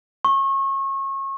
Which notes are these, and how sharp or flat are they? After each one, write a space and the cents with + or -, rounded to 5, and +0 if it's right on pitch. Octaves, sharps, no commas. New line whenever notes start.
C#6 -30